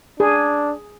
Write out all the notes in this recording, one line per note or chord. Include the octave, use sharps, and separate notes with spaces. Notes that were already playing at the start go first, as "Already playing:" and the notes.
D4 G#4